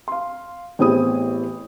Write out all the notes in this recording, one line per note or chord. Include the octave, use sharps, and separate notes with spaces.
F5 C6
A1 B3 C4 E4 G#4 D#6